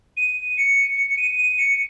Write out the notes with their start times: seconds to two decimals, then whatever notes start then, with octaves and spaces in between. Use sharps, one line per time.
0.17 D#7
0.57 C#7
0.97 C#7
1.10 C#7
1.17 D#7
1.38 D#7
1.58 C#7